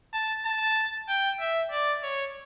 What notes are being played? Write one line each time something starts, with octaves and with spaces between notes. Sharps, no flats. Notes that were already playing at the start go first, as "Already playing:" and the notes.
A5
A5
G5
E5
D5
C#5